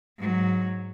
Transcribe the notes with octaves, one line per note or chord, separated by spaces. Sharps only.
G#2 F#3